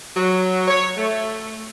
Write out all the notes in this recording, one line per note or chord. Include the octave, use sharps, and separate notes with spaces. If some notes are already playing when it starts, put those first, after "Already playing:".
F#3
C#5
A3